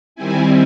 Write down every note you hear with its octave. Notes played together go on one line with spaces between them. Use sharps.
D#3 G3 C4 E4 G#5